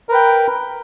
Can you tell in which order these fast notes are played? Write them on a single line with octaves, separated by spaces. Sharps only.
A#4 B4 G5